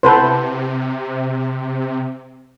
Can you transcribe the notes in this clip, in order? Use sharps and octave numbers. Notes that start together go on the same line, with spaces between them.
C3 A4 B4 C5